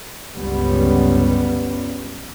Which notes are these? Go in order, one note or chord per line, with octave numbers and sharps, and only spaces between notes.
G1 C#2 G3 B3 C#4